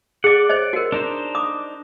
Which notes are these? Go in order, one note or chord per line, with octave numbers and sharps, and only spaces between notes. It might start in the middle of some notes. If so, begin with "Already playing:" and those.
G#4 D5 F#5 D6
C5 C#5 D#5
F#4 A#4
D4 D#4 C5
D6 D#6